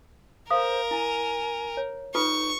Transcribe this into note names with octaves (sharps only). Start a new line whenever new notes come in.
A4 A#4 C5 F5 D#6
E4 G#5
C#5
D#4 F4 A4 B4 C#6